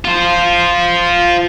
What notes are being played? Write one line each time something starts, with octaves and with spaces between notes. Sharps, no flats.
F4 C5